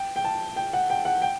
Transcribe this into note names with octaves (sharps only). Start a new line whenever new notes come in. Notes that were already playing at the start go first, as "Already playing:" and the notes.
Already playing: G5
G5
A5
G5
F#5
G5
F#5
G5